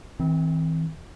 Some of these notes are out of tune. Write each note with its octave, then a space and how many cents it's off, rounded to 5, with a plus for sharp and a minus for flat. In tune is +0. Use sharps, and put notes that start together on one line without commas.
E3 -40 C4 +0